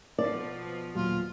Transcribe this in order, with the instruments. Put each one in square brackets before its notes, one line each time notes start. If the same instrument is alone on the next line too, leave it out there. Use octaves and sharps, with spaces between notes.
[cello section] B2 F3 [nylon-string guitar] D5
[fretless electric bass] D#1 A#2 F#3 [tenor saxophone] F4